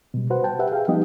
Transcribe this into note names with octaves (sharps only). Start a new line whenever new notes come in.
B2 G3
F#4 B4 C5 F#5
G5 A5
G4 B4 E5 F#5
G#4 F5 G5
F3 G3 B3 D#4 G4 D#5